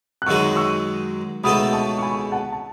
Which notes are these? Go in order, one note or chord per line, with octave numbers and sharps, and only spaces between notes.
F#6
F#2 D#3 G#3 D#4 F#4 C#6 E6
C#6 E6
C#2 B2 A3 D#4 A4 B5 D#6
A5 C#6
C#6
G#5 B5
F#5 A5
A5